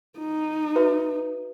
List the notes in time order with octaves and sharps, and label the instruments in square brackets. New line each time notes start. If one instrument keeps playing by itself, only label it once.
[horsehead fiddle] D#4
[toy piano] F#4 B4 E5